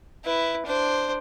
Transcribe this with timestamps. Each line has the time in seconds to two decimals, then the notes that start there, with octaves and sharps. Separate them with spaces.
0.24 E4 B4
0.66 D4 C5